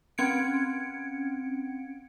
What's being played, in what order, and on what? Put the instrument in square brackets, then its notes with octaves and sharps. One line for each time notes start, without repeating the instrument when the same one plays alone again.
[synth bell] C4 C#4 G#6 C#7 D7